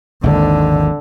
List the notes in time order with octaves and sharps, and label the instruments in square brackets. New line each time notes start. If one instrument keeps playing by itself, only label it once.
[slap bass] G#1 D#2 [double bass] D3